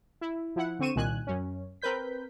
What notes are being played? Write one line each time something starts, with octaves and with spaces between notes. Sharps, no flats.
E4
F3 E4 F#5
D3 C4 C#6 D#7 E7
C2 A#2 D#3 G#5 F#6
F#2 C#4
C4 A#4 B4 G6 B6